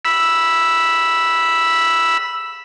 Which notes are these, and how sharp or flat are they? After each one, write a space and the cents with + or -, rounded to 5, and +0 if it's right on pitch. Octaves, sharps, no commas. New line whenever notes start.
B5 -10 E6 +5